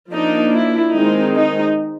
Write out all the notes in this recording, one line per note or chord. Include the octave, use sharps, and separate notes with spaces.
F3 A#3 D4 D#4
E4
D#3 G#3 C4 D#4
D#4